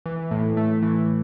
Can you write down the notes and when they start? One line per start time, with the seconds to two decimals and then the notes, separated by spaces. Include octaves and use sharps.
0.06 E3
0.31 A2
0.57 A3
0.82 E3